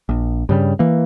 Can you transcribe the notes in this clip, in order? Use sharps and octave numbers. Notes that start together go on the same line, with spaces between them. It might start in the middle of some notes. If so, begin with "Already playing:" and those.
A#1
G2 C#3 G3
E3 A#3